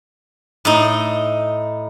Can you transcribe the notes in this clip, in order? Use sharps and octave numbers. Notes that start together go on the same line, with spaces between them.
A2 D#4